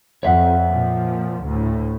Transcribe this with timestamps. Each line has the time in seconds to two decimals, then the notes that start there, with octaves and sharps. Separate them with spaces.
0.23 F2 C#5 E5 F#5
0.71 A#2 F3
1.45 D2 A2